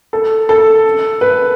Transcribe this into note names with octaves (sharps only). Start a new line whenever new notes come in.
A4
A4
B4